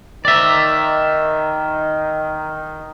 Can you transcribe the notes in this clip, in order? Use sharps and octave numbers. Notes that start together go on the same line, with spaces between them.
D#3 D5 E5